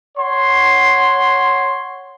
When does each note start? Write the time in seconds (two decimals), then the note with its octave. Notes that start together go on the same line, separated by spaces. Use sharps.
0.18 C#5 F#5 C6